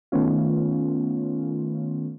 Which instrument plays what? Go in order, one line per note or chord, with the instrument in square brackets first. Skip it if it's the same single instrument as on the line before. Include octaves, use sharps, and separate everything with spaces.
[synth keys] D#3 A3 B3 C#4 F4